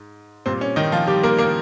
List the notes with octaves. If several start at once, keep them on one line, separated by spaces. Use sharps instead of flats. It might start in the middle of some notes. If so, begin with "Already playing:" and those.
Already playing: G#2
A#2 G3 C4
C#4
D#3 D#4
F3 F4
G3 G4
A#3 A#4
A#3 A#4